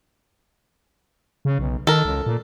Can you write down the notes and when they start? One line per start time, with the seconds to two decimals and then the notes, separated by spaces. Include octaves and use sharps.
1.45 C#3
1.59 B1
1.87 D#3 A4 A#4
2.05 C#2
2.26 A#2